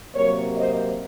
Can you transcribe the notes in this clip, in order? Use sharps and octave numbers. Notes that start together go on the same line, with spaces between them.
C3 F#3 A#3 A#4 C#5
C5 D#5